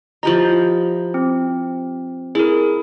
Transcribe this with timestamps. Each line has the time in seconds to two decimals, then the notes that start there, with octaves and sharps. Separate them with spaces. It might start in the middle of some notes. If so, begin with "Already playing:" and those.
0.23 F3 E4 G4 D#5 A#5
1.14 C4
2.35 E4 G#4 A#4